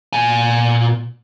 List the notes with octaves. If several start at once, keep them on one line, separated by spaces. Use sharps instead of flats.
A#2 G#5